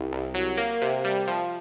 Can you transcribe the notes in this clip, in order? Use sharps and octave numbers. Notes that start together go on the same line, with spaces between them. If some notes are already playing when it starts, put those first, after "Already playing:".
Already playing: C2
C2
F#3
A#3
C3
G3
F3